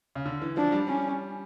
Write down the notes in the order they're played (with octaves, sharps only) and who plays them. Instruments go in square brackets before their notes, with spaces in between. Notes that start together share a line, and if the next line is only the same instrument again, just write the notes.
[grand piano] C#3
D3
E3
[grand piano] F3 [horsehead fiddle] D4
[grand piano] G3
[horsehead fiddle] C#4